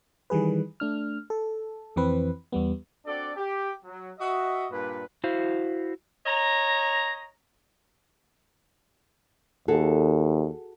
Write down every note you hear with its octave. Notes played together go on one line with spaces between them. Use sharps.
D#3 E3 G3 G#4 B4
A3 D4 F6
A4
F2 E3 C4 B4
E2 G3 B3
C4 D4 F#4 A4 D5
G4
F#3
F#4 D#5 E5
G2 A#2 B4
E4 F#4 C5 F5
C#5 D#5 A#5
D#2 F#4 G#4 A4